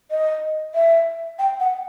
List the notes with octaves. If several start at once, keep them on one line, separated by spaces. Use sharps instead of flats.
D#5
E5
G5
F#5